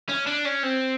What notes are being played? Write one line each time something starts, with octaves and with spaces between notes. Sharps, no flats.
C#4
D4
C#4
C4